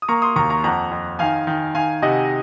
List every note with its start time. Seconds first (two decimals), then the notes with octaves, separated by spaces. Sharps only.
0.02 D#6
0.08 A#3 A#5 C#6
0.22 C6 D#6
0.36 D#2 A#5 C#6
0.50 A#5 C#6
0.64 F2 F#5 A#5
0.91 F2
1.19 D#3 F5 G#5
1.47 D#3
1.75 D#3 F5 G#5
2.02 C3 D#5 F#5